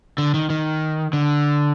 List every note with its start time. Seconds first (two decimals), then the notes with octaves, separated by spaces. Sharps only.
0.18 D3
0.34 D#3
0.50 D#3
1.13 D3